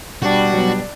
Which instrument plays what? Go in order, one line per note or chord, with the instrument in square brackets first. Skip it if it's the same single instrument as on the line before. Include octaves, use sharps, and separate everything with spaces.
[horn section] B2 G3 [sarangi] D4 [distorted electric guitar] F#4
[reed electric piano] F#3 B3